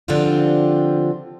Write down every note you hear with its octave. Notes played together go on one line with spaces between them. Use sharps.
D3 F3 C4 D4 F4 G4